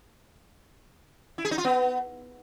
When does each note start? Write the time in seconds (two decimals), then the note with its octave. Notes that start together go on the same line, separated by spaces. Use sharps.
1.38 E4
1.45 G#4
1.51 D#4
1.58 F4
1.65 B3